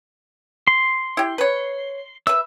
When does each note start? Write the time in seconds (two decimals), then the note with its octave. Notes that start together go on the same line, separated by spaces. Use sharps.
0.68 C6
1.17 E4 G4
1.38 B4 C#5
2.27 B4 E5 E6